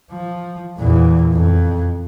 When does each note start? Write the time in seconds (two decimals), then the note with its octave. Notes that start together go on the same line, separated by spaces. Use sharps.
0.11 F3
0.78 E2 A#2
1.32 F2